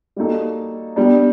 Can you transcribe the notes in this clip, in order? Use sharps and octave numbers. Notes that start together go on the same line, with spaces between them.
G3 A#3 D#4 F#4 A4
G3 B3 D4